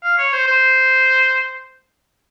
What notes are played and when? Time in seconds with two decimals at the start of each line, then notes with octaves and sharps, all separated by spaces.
0.04 F5
0.18 C#5
0.33 C5
0.47 C5